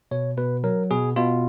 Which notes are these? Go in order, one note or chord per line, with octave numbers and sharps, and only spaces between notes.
B2 C#5
B2 B4
F#3 A#4
B2 G#4
B2 F4